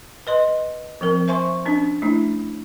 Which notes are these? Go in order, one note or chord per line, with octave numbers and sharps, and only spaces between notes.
B4 D#5 C6
F3 C4 A#4
C5 E5 G#5 C6 C#6
C#4 D4
A3 D4 E4